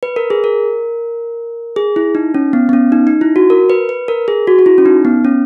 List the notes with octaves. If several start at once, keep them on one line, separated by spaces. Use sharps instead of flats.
B4
A#4
G#4
A#4
G#4
E4
D#4
C#4
B3
B3
C#4
D#4
D#4
E4
F#4
A#4
B4
B4
A#4
G#4
F#4
F#4
E4
C#4
D#4
B3
C#4